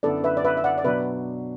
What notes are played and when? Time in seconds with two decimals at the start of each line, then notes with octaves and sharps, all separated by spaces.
0.03 F#2 D3 B3 E4 A4 D5
0.24 B4 E5
0.37 D5
0.44 B4 E5
0.57 E5
0.64 D5 F#5
0.78 D5
0.84 B2 F#3 D4 B4 E5